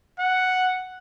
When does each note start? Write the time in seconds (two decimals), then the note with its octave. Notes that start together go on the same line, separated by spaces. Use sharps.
0.20 F#5